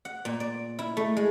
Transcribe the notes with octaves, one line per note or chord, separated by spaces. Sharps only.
F#5
A#2
D5
E4
A3
G#3